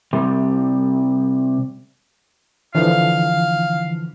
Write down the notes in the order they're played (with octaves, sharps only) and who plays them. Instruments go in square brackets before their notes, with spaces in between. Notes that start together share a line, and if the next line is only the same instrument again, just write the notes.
[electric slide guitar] C3 G3
[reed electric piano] D3 E3 F3 [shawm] F5